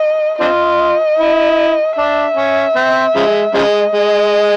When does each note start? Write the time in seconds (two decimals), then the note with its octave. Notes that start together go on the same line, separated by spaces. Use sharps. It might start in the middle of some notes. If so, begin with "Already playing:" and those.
Already playing: D#5
0.40 C4 D4 F4 D#5
1.19 E4
1.97 D4 E5
2.37 C#4
2.76 C4
3.15 C#3 F3 G#3
3.54 C#3 F3 G#3 D#5
3.94 G#3